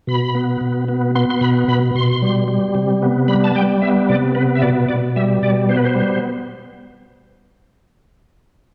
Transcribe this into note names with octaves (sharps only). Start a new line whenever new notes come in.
B2 B5
B3
B2
B3
B3 C6
C6
B2 B5
B2 B5
B2 C6
G3
G3
C3
B3
G3 B5
A5
G3 G5
B3 E5
C3 D5
B3 B4
E5
B2 D5
B2 D5
G3 E5
B2 D5
B3 C5
B4
C5
G3